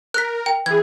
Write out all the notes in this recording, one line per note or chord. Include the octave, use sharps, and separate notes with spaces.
A#4 F#6 B6
G5
E3 G#4 G#6